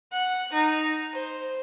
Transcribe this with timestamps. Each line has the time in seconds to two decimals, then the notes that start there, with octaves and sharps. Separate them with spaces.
0.12 F#5
0.52 D#4
1.13 C5